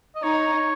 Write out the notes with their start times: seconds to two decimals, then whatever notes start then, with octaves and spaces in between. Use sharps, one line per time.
0.16 D#5
0.23 D#4 C#5